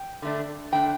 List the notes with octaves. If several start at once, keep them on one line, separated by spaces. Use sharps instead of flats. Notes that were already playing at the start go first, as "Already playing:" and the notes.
Already playing: G5
D3 A3 D4
D3 A3 D4 G5